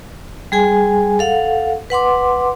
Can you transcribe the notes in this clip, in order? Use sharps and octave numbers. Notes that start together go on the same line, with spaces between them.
G3 G#4 G#5
A4 F5 F#5
B4 F#5 C6 D6